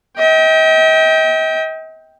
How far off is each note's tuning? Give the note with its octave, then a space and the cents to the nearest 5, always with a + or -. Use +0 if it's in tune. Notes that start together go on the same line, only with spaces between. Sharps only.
D#5 +45 G5 +0